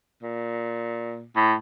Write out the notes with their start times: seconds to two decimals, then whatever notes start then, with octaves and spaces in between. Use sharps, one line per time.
0.23 A#2
1.36 A2